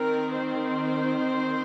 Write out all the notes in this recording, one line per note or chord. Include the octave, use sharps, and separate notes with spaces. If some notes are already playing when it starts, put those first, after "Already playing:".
Already playing: D#3 C4 A#4
C5